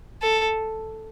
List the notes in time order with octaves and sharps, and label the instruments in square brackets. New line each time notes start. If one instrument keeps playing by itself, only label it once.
[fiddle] A4